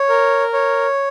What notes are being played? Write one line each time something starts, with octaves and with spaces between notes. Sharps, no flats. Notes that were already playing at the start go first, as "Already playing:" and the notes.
Already playing: C#5
A#4
C#5